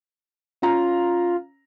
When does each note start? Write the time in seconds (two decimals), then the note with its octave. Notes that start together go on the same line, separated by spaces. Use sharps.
0.62 C#4 F4 A#5